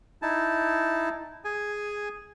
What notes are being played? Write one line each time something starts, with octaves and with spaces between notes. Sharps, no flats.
D#4 E4 A5
G#4 G#5